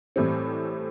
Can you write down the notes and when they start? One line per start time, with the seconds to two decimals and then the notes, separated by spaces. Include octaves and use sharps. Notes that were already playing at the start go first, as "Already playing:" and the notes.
0.16 A2 E3 G3 C4